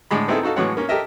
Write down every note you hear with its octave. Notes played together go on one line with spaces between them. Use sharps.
A2 D3 G#3 B5
B3 C4 D#4 E4 G#4 A4
D#4 F#4 A4 F5
A2 E3 F#3 G#3 C#5 F#5
A#3 C#4
G4 A4 A#4 D#5 E5